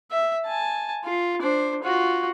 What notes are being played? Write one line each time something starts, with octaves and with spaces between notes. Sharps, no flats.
E5
G#5 A5
F4
D4 C5
F4 F#4